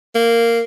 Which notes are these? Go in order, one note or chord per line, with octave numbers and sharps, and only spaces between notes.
A#3